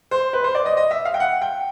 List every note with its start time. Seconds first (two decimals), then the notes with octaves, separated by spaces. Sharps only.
0.11 C5
0.33 B4
0.44 C5
0.55 D5
0.65 D#5
0.77 D#5
0.91 E5
1.05 F5
1.14 G5
1.20 F#5
1.42 G5